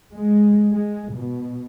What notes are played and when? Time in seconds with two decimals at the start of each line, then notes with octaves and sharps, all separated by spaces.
0.14 G#3
0.71 G#3
1.14 B2